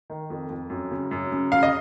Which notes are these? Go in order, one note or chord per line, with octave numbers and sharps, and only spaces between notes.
D#3
F2
F2
F#2
C#3
F#2
C#3
C#3 F5
D#5